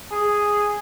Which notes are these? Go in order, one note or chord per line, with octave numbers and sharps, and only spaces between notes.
G#4